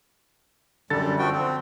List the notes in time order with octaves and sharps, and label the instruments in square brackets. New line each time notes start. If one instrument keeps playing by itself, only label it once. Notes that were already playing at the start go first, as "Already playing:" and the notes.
[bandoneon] F#2 G3 [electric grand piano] D3 A4 A6
[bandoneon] F3 F#4 G5
C4